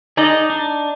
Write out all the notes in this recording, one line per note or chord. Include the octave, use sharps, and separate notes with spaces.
D#4 G#4 D5 D#5
D4